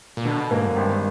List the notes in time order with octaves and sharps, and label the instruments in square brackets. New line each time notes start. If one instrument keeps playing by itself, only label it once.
[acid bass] A#2
[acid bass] B2 [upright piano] D3
[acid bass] G#2 [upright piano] A#3
[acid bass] F#2
[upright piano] G#1 [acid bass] G2